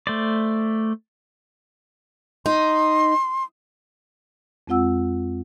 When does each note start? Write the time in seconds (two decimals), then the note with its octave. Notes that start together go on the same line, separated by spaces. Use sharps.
0.07 A3 C5 D5
2.46 D#4 C6
4.68 F2 G#3 C4 F4 F#5 E6